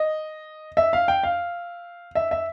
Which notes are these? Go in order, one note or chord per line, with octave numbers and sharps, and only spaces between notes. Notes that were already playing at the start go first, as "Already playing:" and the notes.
Already playing: D#5
E5
F5
G5
F5
E5
E5